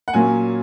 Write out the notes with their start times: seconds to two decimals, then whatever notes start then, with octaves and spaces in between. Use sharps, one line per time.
0.08 F#5
0.13 A#2 F#3 A#3 C#4 G#5